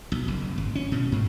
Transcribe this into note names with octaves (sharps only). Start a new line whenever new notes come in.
B1
F#1
G#1
C#4
B2
G#2